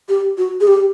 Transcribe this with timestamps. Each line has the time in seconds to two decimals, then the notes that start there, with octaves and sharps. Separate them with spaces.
0.09 G4
0.38 F#4
0.61 G#4
0.67 G4